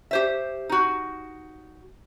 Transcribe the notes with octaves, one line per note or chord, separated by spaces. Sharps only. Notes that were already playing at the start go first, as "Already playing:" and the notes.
G4 C5 E5
D#4 F#4